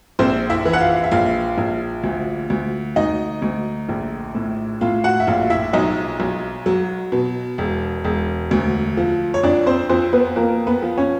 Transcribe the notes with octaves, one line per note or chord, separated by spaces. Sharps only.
A#1 C4 C5
E4 E5
E3
F#5
F4 F5
E5
A#1 F4 F5
A#1
D2
D2
D2 D#4 D#5
D2
A#1
A2
A2 F4 F5
F#4 F#5
E5
A#1 F4 F5
E4 E5
B1 D#4 D#5
B1
F#3
B2
E1
E1
D2
F3
C#5
F2 D4 D5
C4 C5
F2 C4 C5
B3 B4
F2 A#3 A#4
B3 B4
F3
C#4 C#5